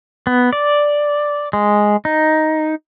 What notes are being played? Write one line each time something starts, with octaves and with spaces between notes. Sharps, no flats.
B3
D5
G#3
D#4